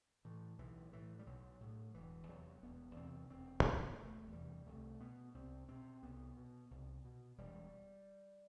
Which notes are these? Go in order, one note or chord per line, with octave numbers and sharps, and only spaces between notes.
A2 E3
B1 E3
A2 E3
G3
B1 F#3
A2
E1 E3
E2 C3 F#3
E1 B3
E2 C3 C4
E1 C4
E2 C3 B3
E1 A3
E2 C3 G3
C2 A3
B2 B3
C2 C4
B2 C4
C2 B3
B2
C2
B2
E1 G3